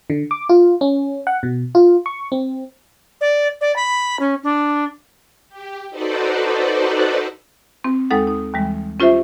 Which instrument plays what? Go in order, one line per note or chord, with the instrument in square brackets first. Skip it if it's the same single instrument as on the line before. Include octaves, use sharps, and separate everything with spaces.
[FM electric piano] D3
D6
F4
C#4
F#5
B2
F4
C#6
C4
[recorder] D5
D5
B5
C#4
D4
[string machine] G4
D#4 F#4 A4 B4 C5 D5
[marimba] C4
D#2 G#3 D#4 A4 F#5
D#4
D#2 E3 G3 G#3
C#4 F4 G4 C5 E5